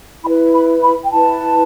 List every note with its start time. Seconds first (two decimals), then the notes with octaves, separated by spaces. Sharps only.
0.24 E4 B4 B5
0.53 B5
0.82 B5
1.04 G5
1.11 E4 B4 A5